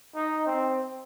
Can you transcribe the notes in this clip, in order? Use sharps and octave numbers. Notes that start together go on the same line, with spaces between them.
D#4
C4